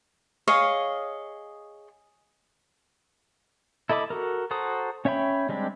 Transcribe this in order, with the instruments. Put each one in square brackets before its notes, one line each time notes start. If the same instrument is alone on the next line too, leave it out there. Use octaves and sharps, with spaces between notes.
[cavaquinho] G#4 C#5 D#5 F5
[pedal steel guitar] E4 A4 D#5 B5 D6
F#4 A4 A#4
F#4 A4 C5 A#5 D#6
C#4 C#5 E5 G5 B5
G3 G#3 C4 D4 G4